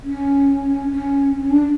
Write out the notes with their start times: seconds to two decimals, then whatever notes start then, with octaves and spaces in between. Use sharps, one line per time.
0.04 C#4
0.92 C#4
1.36 C#4
1.51 D4